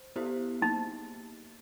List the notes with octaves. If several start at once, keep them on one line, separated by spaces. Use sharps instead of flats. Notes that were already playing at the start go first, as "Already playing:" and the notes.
Already playing: C5
B3 E4 G4 C5
A#3 D#4